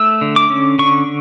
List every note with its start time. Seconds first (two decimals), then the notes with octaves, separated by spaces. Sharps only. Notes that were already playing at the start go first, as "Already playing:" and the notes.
Already playing: A3 E6
0.21 D3
0.36 D6
0.50 C#4
0.79 D3 C#6